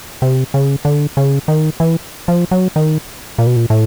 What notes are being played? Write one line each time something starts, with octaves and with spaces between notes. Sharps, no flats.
C3
C#3
D3
C#3
D#3
E3
F3
F#3
D#3
A#2
B2
A#2
A2